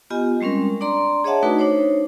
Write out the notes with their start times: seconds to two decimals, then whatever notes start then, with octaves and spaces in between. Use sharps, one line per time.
0.10 B3 F4 G4 D#5 G#5
0.41 G3 G#3 C4 C#4 A#4
0.81 D4 D5 A#5 C6
1.24 G#4 C#5 D#5 E5 F#5 A5
1.43 A3 D4 D#4 F#4 B4
1.59 D4 D#4 C5 C#5